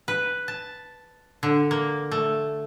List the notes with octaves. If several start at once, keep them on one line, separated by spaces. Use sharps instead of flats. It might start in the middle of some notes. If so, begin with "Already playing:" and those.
B4
A5
D3
A#3
A3